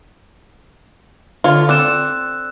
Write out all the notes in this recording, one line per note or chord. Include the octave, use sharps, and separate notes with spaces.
D3 F4 C#5
C4 A4 D5 E6 F#6 E7